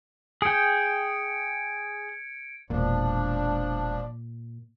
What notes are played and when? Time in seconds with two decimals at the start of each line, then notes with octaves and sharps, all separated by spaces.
0.42 G#4 G5 G#6 C#7 D7
2.70 E1 A#2 F3 G#3 D4